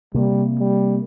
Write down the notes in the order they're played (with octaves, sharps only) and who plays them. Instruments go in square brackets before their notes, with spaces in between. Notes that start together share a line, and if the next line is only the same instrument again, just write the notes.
[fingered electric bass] C3 A#3 [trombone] G3
[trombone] G3